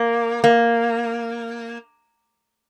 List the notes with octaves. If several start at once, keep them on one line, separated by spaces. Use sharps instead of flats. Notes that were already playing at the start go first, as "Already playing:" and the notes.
Already playing: A#3
A#3